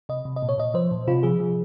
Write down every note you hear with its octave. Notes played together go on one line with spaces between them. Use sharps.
C3 D#5
C3
D#5
A#2
C#5
A#2 D#5
F3 C5
A#2
C3 F4
F3 G#4
F3